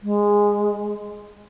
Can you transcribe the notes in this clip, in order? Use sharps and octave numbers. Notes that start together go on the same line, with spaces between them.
G#3